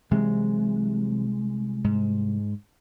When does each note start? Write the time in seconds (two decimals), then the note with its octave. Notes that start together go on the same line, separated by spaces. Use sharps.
0.11 C2 C3 E3 F#3 G#3
1.84 G#2